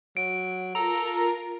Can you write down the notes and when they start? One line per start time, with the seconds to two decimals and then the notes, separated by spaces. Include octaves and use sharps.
0.17 F#3 D7
0.75 F4 A4 A#4 A#5